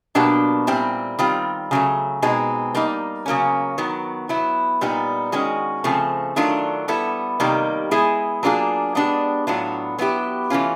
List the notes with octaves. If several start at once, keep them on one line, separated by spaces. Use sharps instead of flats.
B2 F#3 A#3 D4 G4
A#2 G3 C4 E4
D#3 G3 C4 F4
C#3 F#3 A3
B2 G#3 C4 D#4
G3 A#3 D#4
C#3 F#3 A#3 C#4
D#3 F#3 B3
F#3 B3 E4
A#2 G3 B3 D#4
D#3 G#3 C#4 F#4
C#3 F3 A3 C4
D#3 F#3 A3 D4 F4
G3 B3 E4 A4
C3 D#3 G3 A#3 D#4
G#3 B3 E4 G#4
F#3 A#3 D4 F4 G#4
G#3 B3 D4 G4
A2 F#3 B3 D4 F4
F#3 B3 E4 G4
E3 A3 C#4 F4